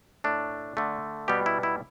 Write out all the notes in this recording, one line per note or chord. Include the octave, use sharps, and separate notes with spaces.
A2 A3 D4
D3 A3
B2 G3 B3 G4
E4
E4